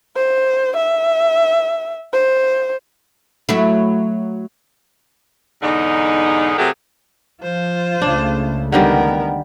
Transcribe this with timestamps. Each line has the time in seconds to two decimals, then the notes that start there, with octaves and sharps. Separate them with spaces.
0.16 C5
0.76 E5
2.13 C5
3.49 F#3 A3 E4
5.62 E2 G#2 D3 D#4
6.58 C3 F#3 A3 G4 G#4 A#4
7.42 F3 F4 C5
8.02 C#2 C#3 A3 D4
8.72 D3 D#3 G3 B3 A#4